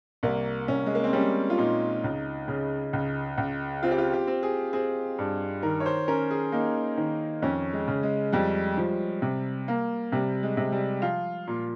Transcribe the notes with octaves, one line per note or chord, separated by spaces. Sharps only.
C2 A#3
C2 C#4
G#3
A#3
C4
G3 C#4
F4
A#2 D#4
C#2
C#3
C#2
C#2
C4 F4
G4
F4
G4
C4
G#4
C4 G#4
G2
D#3 A#4
C#5
C5
C#4 A#4
G#4
A#3 D#4
D#3
F2 C#4
G#3
C#3
G#3
F2 G3
F3
C3
A#3
C3 G3
G#3
C3
G3
F3 F4
A#2